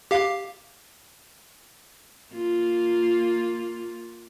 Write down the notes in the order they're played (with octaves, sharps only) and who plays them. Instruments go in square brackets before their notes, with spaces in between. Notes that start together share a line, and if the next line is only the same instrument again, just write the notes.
[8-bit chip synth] G4 F5
[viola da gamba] A#3 F4